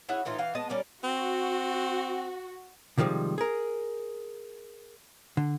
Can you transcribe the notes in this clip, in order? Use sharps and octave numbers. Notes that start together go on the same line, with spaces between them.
C#4 E4 F#4 G#4
A2 E3 D#4 F4
E3 F5 G5
G#3 B3 D#5 A5
G3 C#4 A#4 D5
C4 F#4
C3 D#3 F3 G3 G#3
G#4 A#4
D3